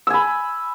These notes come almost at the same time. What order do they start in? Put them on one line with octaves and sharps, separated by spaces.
E6 G#5 B5